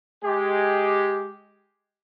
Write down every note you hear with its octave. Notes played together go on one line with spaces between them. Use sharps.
G#3 G4